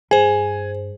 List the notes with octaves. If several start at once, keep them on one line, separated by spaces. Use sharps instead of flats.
G2 G#4 C5 G#5